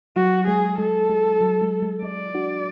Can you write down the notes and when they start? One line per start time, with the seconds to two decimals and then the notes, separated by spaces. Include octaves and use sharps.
0.16 F#3 F#4
0.48 G#3 G#4
0.78 G#3 A4
1.10 G#3
1.41 F#3
1.62 G#3
1.82 G#3
2.03 G#3 D5
2.34 D4 F#4